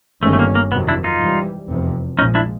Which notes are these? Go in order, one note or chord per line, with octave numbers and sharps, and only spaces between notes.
G1 G2 D#3 G#3 A3 C#4
A3
A#3
A#3
F2 C3 D#3 F#3 B3
D4 E4
D#4 F4
G#2 E3 G3
F1 E2 C3 F3
A#1 A#2 F3 G#3 C#4 D#4
D4 E4